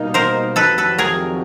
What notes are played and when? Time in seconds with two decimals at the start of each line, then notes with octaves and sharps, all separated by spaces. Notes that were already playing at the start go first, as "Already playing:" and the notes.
Already playing: B2 G3 A#3 D#4
0.14 A#4 C5
0.56 F2 C3 D#3 F#3 A4 B4
0.78 A4 B4
0.98 G#4 A#4